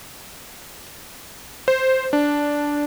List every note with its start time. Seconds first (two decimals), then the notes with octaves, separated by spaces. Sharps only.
1.68 C5
2.13 D4